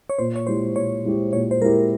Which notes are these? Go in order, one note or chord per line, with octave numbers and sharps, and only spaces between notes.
C#5
A#2 C5
C#5
G#3 E4 G4 C5
A#2 C#5
G#3 E4 G4
A#2 C#5
C5
G#3 E4 G4 A#4